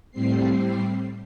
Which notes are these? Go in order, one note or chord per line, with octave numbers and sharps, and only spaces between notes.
A2 G3 C4 C7